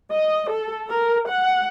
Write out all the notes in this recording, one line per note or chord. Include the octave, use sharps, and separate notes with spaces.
D#5
A4
A#4
F#5